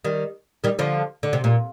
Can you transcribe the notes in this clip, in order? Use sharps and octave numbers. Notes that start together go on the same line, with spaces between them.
D#3 G3
D#3 G3
D3 F3
D3
C3
A#2